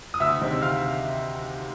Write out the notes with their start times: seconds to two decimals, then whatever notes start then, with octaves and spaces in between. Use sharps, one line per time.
0.14 D#6
0.20 D2 E5 E6
0.41 C3 D#3 G#3 C4
0.61 D2 F5 F6